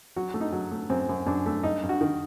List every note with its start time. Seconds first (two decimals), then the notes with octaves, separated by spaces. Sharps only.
0.16 F#3 F#4
0.34 A3
0.41 D#4
0.52 F#3
0.72 A3
0.90 F#2 C4
1.09 F#2
1.27 F#2 D4
1.46 A3
1.63 G2 D#4
1.83 G2
1.89 F#4
2.01 D#3